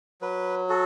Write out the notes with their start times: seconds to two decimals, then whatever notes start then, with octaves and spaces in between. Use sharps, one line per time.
0.21 F#3 B4
0.69 F#4 A4